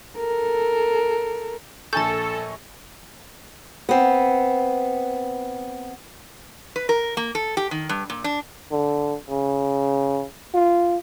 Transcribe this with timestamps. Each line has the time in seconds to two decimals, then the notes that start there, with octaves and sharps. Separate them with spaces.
0.19 A4 A#4
1.93 A#1 A4 G#5 A5 C#6 G6
3.89 B3 C4
6.76 B4
6.89 A#4
7.17 A#3
7.35 A4
7.57 G4
7.71 D#3
7.89 G2
8.10 A#2
8.24 D4
8.71 D3
9.29 C#3
10.54 F4